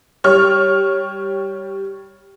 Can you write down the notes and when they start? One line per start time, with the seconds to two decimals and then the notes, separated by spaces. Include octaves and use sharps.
0.24 G3 C#5 F6